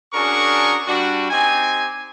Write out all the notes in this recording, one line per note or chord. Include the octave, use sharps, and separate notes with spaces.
C#4 D4 F#4 G#4 A#4 C#6
G3 D4 F#4
C4 D#4 G4 G#5